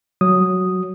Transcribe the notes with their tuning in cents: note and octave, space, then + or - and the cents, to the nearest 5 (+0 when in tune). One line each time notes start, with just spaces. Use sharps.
F#3 +0 D#6 +0